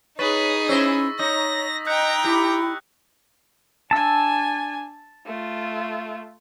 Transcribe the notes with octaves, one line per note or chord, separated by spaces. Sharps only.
D#4 G#4 B4 C#5 C#6 A6 B6
C#4 E4 C5 C#5 E6 A#6
D#4 C#5 D#6 A#6
D#5 G5 A#5 F#6 G6 C#7
E4 G4
D4 G#5 A5 E6
A3 F4